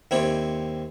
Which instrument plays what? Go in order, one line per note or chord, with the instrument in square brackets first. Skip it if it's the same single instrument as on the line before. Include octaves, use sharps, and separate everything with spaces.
[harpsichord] D#2 C4 E4 C#5 D5